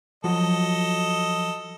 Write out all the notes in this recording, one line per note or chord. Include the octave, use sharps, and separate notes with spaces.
F3 F#3 F#4 A4 D#5